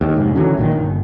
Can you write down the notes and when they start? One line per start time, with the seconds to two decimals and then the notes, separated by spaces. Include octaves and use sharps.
0.01 D#2
0.15 F1 G#2
0.35 D3 E3 F#3 C#4
0.57 A#1 A#2 D#3
0.72 G1